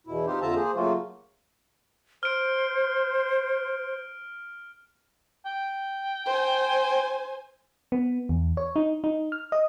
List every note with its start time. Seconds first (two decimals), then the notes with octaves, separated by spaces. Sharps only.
0.07 E2 B2 E4
0.27 C4 D#4 F4 G4 C5
0.42 F2 D3 F4 E5 A5 A#5
0.55 A#3 G#4 C5
0.76 C#3 F#3 A3 A#3 F4 F#4
2.23 C5 F6 D7
5.46 G5
6.26 C5 G#5
7.92 B3
8.29 E2
8.57 C#5
8.76 D#4
9.04 D#4
9.32 F6
9.52 D#5